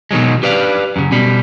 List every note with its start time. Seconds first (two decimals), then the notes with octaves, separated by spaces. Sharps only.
0.11 B2 D#3 F#3 G#3
0.43 G4 B4 D5 F5
0.96 F#2 C#3
1.12 B2 G3